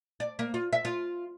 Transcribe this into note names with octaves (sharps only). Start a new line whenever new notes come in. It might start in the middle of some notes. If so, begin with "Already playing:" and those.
D5
A#3
F4
E5
F4